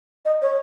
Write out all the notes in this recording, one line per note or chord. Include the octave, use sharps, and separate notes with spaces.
D#5
C#5